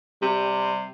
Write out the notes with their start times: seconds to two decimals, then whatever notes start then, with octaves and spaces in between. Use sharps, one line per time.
0.22 C3 G3